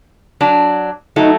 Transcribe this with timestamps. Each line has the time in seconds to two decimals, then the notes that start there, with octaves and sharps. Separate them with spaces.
0.41 F#3 D4
1.16 F#3 A3 D#4